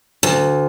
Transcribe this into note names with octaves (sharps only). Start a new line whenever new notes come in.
D2